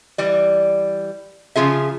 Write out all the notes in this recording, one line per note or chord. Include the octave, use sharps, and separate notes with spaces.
E3 G3 D5
C#3 F3 F4 G#4 E5